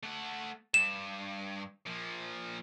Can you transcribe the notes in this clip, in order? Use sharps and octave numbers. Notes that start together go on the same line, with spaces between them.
A3 F#5
G2 E7
A#2 F3